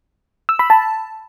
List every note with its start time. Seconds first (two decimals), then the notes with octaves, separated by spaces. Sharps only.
0.49 E6
0.59 B5
0.70 A5